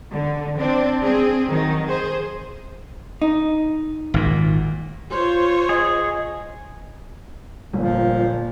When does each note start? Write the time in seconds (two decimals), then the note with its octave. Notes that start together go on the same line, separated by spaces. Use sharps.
0.12 D3
0.58 C4 D4
1.02 C4 G#4
1.48 D#3 F#3 D#4
1.85 G#4 C5
3.22 D#4
4.14 G#1 A#2
5.12 F4 C5 C#5 C6
5.69 G#4 D#5
7.73 G1 A#2 F3